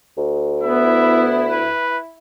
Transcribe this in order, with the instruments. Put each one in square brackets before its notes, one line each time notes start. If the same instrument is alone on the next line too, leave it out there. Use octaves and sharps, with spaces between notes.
[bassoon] D2
[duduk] B3 [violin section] E4 [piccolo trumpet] E5
[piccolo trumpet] B4